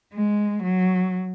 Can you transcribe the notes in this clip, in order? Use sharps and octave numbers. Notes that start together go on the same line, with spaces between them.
G#3
F#3